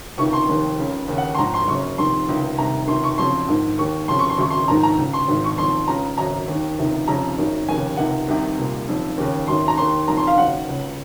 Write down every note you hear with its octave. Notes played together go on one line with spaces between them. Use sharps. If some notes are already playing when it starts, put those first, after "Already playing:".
C#2 C3 D#3 C#6
C6
F1 D#2 D#3
C#2 C#3
D#2 C#3
F#5
C6
A#1 G#2 D#3 A#5
C6
F#1 F#2 C#3 C#6
F1 F2 D#3 C6
C#2 C3 D#3
C2 C3 D#3 A#5
C#2 C3 D#3 C6
C#6
F#1 F2 C#3 C6
A#1 G#2 D#3
D#2 D#3 C#6
F1 F2 C#3 C6
C#6
C6
G#1 F#2 C#3 C#6
C6
A#1 G#2 D#3 A#5
A#5
C#2 C#3
C6
G#1 G#2 D#3
C#6
F#1 F2 D#3 C6
C#2 C#3 A#5
G#1 F#2 C#3 A#5
D#2
D#3
C#2 C3 D#3
F1 F2 C#3 A#5
G#1 F#2 D#3
F1 D#2 C#3 G#5
C#2 C3 D#3 F#5
C2 C3 D#3
C2 A#2
F#1 F2 D#3
D#2 C#3
G#1 F#2 D#3 C6
A#5
D#2 D#3 C6
F#1 F2 D#3 A#5
C6
F5
F#1 F#2 D#3 F#5
C#2 C#3